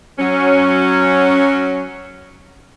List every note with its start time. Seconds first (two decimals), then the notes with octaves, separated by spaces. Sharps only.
0.19 F#3 C#4